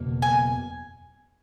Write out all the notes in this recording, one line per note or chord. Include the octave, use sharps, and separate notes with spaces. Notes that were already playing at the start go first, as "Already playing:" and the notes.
Already playing: F#1 E2 B2 A#3
G#5